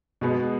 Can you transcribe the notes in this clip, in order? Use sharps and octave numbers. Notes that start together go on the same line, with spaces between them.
B2 G#3 B3